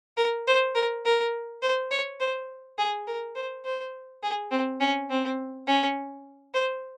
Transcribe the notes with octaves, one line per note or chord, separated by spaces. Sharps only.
A#4
C5
A#4
A#4
C5
C#5
C5
G#4
A#4
C5
C5
G#4
C4
C#4
C4
C#4
C5